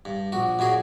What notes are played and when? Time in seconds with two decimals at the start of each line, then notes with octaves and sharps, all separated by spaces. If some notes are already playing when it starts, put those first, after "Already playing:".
0.05 G2
0.32 A#1 F#4
0.59 F#2 A#2 F#4 G#4